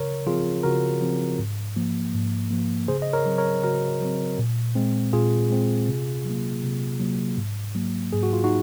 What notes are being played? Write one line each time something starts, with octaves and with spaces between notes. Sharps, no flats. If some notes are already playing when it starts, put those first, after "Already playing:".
Already playing: C#3 A#4 C#5
F3 C4 F4 G#4
C#3 F#4 A#4
F3 C4
G#2
F3 A#3
G#2
F3 A#3
C#3 G#4 C5
D#5
A#4 C#5
F#3 C4
A#4 C#5
C#3 F#4 A#4
F#3 C4
A#2
G#3 C4
A#2 F4 G#4
G#3 C4
C3
F#3 A#3
C3
F#3 A#3
G#2
F#3 A#3
G#2 G#4
F#4
F4
D#4 F#4